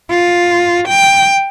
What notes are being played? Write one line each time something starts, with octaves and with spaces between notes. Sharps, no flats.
F4
G5